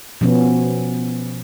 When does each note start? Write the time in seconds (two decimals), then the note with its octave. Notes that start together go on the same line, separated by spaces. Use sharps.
0.21 B2 F3 B3 C#4